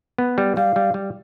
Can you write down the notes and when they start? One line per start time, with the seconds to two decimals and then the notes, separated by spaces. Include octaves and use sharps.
0.18 B3
0.38 G3
0.57 G3 F5
0.76 G3
0.94 G3